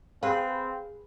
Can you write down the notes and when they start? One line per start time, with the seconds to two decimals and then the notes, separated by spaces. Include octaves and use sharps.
0.23 C4 G#4 B4 F5